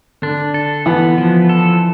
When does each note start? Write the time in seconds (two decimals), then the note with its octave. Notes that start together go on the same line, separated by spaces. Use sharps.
0.22 D3 D4
0.54 A4
0.86 E3 B3
1.18 F3
1.49 A4